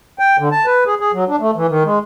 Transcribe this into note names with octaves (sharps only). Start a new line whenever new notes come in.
G5
D3
A5
B4
G#4
G#4
F#3
D4
A3
E3
D#3
G#3